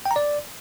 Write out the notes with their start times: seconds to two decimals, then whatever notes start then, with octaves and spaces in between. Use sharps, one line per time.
0.06 G5
0.11 A#5
0.16 D5